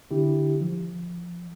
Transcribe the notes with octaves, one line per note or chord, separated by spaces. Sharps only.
D3 D4 E4 G4
F3